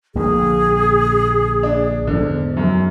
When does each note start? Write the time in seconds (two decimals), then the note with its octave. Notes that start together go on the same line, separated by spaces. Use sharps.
0.15 A#1 A#2 D3 G#4
1.63 D4
2.07 E2 G#2 D3
2.57 F#2